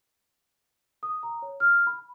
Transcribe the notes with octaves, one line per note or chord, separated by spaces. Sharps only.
D#6
A#5
C#5
F6
B5